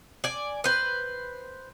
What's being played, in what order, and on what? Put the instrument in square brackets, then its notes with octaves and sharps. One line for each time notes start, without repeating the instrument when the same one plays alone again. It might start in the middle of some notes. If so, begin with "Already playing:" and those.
[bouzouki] D5 G#5
B4 C5